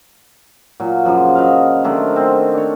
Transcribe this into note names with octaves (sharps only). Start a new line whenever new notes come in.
A#2 F#3
F#2 C#3 F3 F#3
F#3 D#5 F5
D#3 A3 D4 C5
C4
D4 C#5